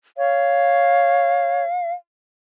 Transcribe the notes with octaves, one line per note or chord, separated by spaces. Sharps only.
C#5 F5